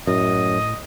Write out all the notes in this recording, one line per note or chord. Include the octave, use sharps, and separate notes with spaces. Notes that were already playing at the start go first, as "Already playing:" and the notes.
F#2 A2 D#5